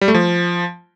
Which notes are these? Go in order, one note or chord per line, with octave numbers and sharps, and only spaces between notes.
G3
A3
F3